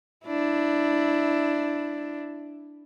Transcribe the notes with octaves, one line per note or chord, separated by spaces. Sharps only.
D4 E4